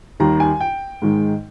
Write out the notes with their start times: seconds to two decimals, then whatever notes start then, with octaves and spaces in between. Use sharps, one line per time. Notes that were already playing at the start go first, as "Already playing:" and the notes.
0.20 D#2 D#3 G3 A#5
0.40 G#5
0.61 G5
1.02 G#2 D#3 G#3